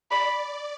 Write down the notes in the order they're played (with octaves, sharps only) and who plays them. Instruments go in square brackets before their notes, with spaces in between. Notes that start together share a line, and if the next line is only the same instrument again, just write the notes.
[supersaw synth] D5 [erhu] B5